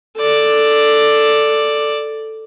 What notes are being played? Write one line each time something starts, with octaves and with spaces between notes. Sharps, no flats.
A4 D5